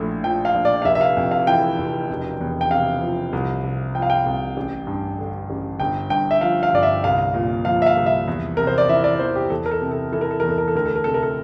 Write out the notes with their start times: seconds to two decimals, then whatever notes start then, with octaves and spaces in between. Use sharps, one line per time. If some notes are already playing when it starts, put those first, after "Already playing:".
Already playing: A#1 A2
0.24 F3 G5
0.45 F5
0.55 A#1
0.65 D5
0.82 F5
0.85 F1 E5
0.95 E5
1.01 F5
1.17 F2
1.31 F5
1.47 E3 G5
1.78 F1
2.10 E1
2.41 E2
2.61 G5
2.71 C3 F5
3.02 F3
3.33 C2
3.64 C3
3.95 F3 G5
4.02 F5
4.10 G5
4.26 C2
4.57 A1
4.87 G2
5.18 D3
5.50 A1
5.80 G1 G5
6.10 G2 G5
6.31 E5
6.41 F3 F5
6.63 F5
6.73 G1 D5
6.83 E5
7.04 C2 F5
7.34 A#2
7.65 F3 F5
7.82 E5
7.87 F5
7.97 C2
8.06 E5
8.28 E2
8.57 C3 A#4
8.67 C5
8.78 D5
8.89 E3 E5
9.04 D5
9.19 E2 C5
9.36 G4
9.50 E2 A4
9.66 A#4
9.71 A4
9.82 C3
9.92 A4
10.12 E3 A4
10.21 A#4
10.31 A4
10.40 E2 A#4
10.49 A4
10.58 A#4
10.68 A4
10.75 D2 A#4
10.86 A4
10.96 A#4
11.04 C3 A4
11.14 A#4
11.23 A4